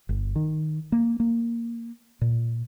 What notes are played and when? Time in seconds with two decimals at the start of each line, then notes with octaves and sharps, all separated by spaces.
0.09 G1
0.36 D#3
0.92 A#3
1.20 A#3
2.21 A#2